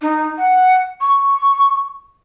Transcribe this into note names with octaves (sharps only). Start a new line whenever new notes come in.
D#4
F#5
C#6